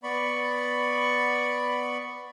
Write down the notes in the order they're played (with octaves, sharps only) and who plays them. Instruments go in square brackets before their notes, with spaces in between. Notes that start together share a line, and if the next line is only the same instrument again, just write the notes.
[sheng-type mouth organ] B3 D5 B5 C#6